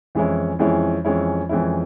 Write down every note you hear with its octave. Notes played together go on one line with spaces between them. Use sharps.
F2 E3 G#3 C#4 E4
F2 E3 G#3 C#4 E4
F2 E3 G#3 C#4 E4
F2 E3 G#3 C#4 E4